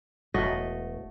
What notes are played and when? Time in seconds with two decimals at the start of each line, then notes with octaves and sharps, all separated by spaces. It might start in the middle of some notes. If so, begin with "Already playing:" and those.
0.34 E1 A3 F#4 D#5